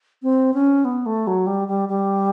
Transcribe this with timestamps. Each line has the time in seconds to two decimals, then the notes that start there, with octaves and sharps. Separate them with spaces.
0.23 C4
0.54 C#4
0.85 B3
1.06 A3
1.27 F#3
1.47 G3
1.68 G3
1.89 G3